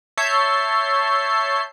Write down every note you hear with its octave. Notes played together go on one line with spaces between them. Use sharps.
C#5 E5 A5 G6 C7